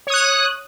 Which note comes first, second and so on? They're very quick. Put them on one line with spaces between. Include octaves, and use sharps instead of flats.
C#5 D#6 F#6